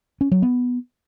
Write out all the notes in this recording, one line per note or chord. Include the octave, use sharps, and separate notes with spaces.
C#4
F#3
B3